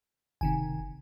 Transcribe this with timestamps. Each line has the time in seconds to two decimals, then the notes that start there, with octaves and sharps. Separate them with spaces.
0.41 F#1 C3 D#3 G#5